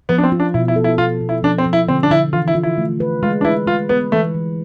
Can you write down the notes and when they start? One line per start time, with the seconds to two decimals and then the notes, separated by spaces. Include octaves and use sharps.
0.09 F3 B3
0.18 D4
0.23 C4
0.32 F4
0.40 D4
0.54 B2 E4
0.68 E4
0.76 A4
0.84 E4
0.98 B2 F4
1.21 B2
1.29 E4
1.43 F3 D4
1.58 C4
1.66 F3
1.73 E4
1.88 D3 C4
2.03 D4
2.11 D3 E4
2.33 E3 F4
2.48 E4
2.55 F4
2.63 E4
2.78 A3
3.00 B4
3.23 G#3 F4
3.41 D4
3.45 E4 B4
3.67 G#3 F4
3.89 B3 B4
4.12 E3 A3
4.34 E3